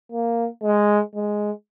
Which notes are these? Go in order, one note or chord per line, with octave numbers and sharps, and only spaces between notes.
A#3
G#3
G#3